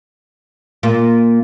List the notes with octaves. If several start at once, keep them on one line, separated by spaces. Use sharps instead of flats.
A#2 A#3